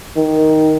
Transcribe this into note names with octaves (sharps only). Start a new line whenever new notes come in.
D#3